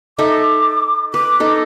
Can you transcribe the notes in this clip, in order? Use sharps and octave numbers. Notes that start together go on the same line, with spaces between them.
D#4 A4 E5 D6
B4 D6
D#4 A4